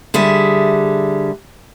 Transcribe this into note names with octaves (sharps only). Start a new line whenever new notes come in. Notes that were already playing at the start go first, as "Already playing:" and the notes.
D3 G3 G#4 E5